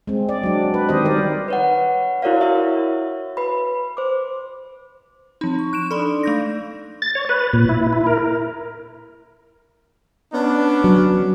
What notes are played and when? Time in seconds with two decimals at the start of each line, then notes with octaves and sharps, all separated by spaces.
0.07 G#3 C4
0.29 D5
0.43 F#3 D4
0.74 B4
0.89 D#3 C4 G4 C5 D#5
1.05 G3 A#4 D5
1.48 B4 C#5 F#5
2.22 E4 F#4 A#4 C#5 D5 F5
2.41 F#4 C#5 E5
3.37 B4 B5
3.97 C5 D6
5.41 F3 C4 D#4
5.59 C#6
5.73 F#6 D7 E7
5.91 D4 D#4 A4 D5 B5 C6
6.23 A3 G6 A#6
7.02 A6
7.15 C#5
7.29 B4
7.53 A#2
7.69 E4
7.93 E4
8.07 A#4
10.33 B3 C#4 D4
10.84 F#3